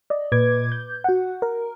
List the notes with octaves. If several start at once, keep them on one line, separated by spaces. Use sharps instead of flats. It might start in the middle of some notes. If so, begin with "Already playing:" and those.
D5 D#5
A#2 B4 D6 G#6
G6
F#4 F#5
A#4